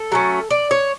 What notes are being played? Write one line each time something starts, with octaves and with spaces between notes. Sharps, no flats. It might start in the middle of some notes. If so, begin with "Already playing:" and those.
Already playing: A4
F#3 A3 C#4
D5
C#5